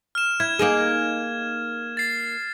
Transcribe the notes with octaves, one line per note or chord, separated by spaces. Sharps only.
F6 E7
E4 G#6
A#3 D#4 G#4
A6 C7